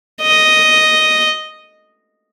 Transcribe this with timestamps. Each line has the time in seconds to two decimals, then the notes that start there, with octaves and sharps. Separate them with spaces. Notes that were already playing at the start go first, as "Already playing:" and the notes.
0.21 D#5